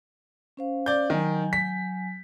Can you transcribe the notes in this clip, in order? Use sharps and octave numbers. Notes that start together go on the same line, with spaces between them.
C#4 C5 F5
D5 G6
D#3 F#3 G#5
B6